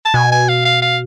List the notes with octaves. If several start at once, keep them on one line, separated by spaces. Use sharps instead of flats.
A5
B2 G#5
G#5
F5
F5
F5